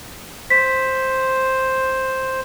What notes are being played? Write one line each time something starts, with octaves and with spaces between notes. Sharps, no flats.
C5 B6